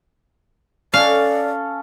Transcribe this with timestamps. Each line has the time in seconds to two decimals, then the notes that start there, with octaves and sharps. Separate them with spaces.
0.94 C#4 A4 D5 F5